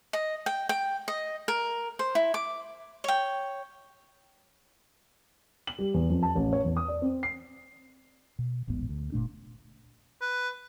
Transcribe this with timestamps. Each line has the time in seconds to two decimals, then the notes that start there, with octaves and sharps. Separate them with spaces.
0.13 D#5
0.46 G5
0.69 G5
1.08 D#5
1.48 A#4
1.99 C5
2.15 E4
2.34 D6
3.04 C#5 G5
5.67 F#7
5.79 G3
5.94 E2
6.10 F2
6.23 A5
6.35 A1
6.53 C#5
6.64 E2
6.77 D#6
6.88 D5
7.02 C4
7.23 C7
8.39 B2
8.67 D#1 A1 G#2 B3
8.89 D2
9.12 F#1 A#2 A3 D4
10.21 B4